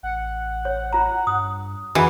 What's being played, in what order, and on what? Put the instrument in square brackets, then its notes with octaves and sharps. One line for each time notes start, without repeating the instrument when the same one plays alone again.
[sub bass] A1 [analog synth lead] F#5
[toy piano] C#5
F4 A#5
[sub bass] G2 [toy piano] D#6
[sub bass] F2 [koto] E3 [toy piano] F#4 G#4 B5 [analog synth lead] F#5